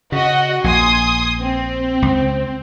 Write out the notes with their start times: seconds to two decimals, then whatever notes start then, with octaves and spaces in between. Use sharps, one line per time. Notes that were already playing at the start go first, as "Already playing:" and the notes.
0.12 C#3 F#4 D#5 F#5
0.64 A#1 A#2 G#5 C6 D#6
1.40 C4
2.02 C#2